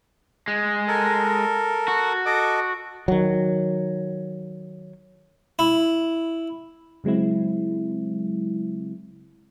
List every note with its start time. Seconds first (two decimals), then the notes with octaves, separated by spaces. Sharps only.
0.48 G#3
0.88 A4 A#4
1.88 F#4
2.26 A4 D#5 D6
3.08 D#3 F#3
5.59 E4
7.04 C#3 F#3 G#3 C4 E4